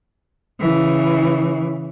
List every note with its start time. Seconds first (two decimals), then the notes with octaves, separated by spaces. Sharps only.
0.60 C#3 E3